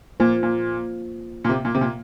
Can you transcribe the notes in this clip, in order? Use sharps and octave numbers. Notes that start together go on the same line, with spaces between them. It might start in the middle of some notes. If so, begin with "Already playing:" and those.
A#2 A#3 F4 C5
A#2
A#2
C3
A#2
C3
A#2